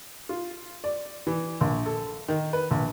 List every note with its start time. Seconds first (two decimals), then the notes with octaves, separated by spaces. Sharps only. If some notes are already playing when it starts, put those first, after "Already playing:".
0.29 F4
0.84 D5
1.27 E3
1.61 A#1
1.86 A4
2.28 D#3
2.53 B4
2.71 A#1